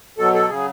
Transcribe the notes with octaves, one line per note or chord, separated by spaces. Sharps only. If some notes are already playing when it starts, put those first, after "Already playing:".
B2 F#3 A4
A4
C#3 F#3 G#4